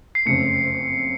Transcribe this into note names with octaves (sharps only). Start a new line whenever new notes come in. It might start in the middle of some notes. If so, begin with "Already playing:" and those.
C7
F#1 F2 C#3 A3 C#7